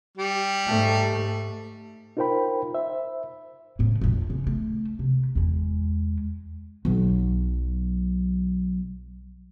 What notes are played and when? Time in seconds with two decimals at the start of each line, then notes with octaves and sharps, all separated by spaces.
0.18 G3
0.66 G#2 A3
2.17 D#4 F4 A#4 C5 G5 B5
2.74 C5 E5
3.79 A2 C#3
4.01 A#1 F2
4.30 C#3
4.47 A3
4.99 C3
5.35 E2 G#3
6.85 B1 F#3